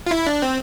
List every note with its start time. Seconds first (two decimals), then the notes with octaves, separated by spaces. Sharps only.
0.06 F4
0.11 E4
0.27 D4
0.42 C4